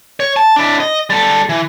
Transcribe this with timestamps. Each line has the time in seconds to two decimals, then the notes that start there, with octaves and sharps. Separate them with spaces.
0.20 C#5
0.36 A5
0.56 D4 E4
0.80 D#5
1.10 G3 A4
1.49 E3